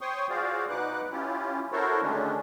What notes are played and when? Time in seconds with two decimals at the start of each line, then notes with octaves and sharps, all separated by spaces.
0.01 C5 C#5 G5 C6 C#6 D#6
0.30 F4 F#4 G#4 C5 D5 F5
0.69 B2 D#4 B4 F#5 D6 F#6
1.12 C#4 E4 F4 G4
1.72 E4 F#4 A4 A#4 C5 C#5
2.02 D3 D#3 G#3 A3 C#4 D4